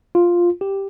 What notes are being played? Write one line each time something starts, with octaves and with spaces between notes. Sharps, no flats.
F4
G4